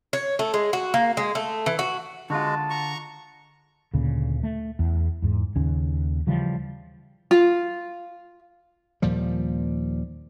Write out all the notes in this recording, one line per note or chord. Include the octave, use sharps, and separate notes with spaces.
C#5
A3
G#3
F#4
A#3
G#3
A3
E3
F#4
D3 G#3 F4 F#4 A5
A#5 C#6
D2 A#2 C#3
A3
E2
E2 G#2
D#2 C#3 C#4
C#3 E3 F3 G3
F4
D#2 A#2 F3 G3